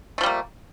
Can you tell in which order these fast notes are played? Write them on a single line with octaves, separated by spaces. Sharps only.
A3 F3 G3 A#3